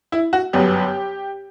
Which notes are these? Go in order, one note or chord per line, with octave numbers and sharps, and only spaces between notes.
E4
F#4
G1 F#2 F#3 B3 G4